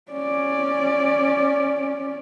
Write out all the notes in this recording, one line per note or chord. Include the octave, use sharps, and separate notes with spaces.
C#4 D5